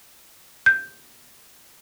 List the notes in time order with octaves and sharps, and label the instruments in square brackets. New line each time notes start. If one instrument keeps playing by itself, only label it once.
[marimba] G6